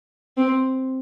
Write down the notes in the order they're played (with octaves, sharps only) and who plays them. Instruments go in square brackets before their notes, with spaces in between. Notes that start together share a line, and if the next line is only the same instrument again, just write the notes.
[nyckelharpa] C4